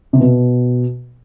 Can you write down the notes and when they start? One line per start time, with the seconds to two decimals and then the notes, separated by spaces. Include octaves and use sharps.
0.13 C3
0.20 B2